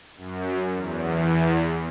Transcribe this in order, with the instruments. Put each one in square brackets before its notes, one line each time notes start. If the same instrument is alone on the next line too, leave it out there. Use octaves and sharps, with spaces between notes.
[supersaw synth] F#2
E2